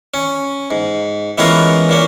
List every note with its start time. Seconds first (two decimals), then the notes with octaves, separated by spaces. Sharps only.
0.14 C#4
0.71 G#2
1.38 E3 G#3 B3 C#4 F4 A#4
1.89 A#2 A#3 C#4